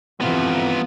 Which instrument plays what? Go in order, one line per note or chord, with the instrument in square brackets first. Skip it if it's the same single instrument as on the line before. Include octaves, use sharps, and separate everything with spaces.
[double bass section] F2 C3 E3 [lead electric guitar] B3 F4